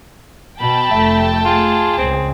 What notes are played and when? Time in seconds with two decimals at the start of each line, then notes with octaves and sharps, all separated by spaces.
0.60 B2 G5 A5 B5
0.91 F1 A3 E5
1.45 F4 G#4
1.98 C#2 C#3 C4